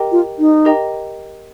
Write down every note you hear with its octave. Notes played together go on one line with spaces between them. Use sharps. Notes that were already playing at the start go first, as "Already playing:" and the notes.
Already playing: G4 A#4 D#5 G5 A#5
F4
D#4
G4 A#4 D#5 G5 A#5